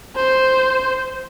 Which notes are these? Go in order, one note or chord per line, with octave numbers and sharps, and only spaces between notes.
C5